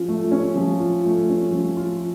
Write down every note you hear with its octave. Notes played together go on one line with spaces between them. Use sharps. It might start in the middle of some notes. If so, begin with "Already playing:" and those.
Already playing: F3 C#4 F4
A3
C#4
F3
F4
A3
C#4
F3
F4